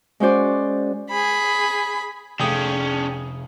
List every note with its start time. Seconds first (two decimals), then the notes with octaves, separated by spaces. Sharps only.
0.20 G#3 C#4 F#4 C5 D5
1.10 G#4 B5
2.40 F1 A3 C#4 D4 G#4 F5 G5 D#6